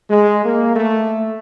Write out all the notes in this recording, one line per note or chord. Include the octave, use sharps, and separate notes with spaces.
G#3
A#3
A3